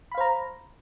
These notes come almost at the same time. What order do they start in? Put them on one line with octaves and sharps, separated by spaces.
B5 F5 C5 A#5